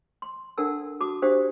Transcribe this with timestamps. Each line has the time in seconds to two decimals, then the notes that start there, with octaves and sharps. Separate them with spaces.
0.22 C6
0.58 D4 A4 A#4 F#5 A5 E6
1.00 F#4 A5 D6 D#6
1.22 D4 G4 C5 F5 D#6